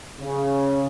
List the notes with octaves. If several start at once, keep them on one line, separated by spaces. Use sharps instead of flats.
C#3